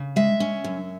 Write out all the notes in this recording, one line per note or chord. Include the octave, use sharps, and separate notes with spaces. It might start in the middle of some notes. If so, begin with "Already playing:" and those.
Already playing: C#3
G#3 E5
C#4
F#2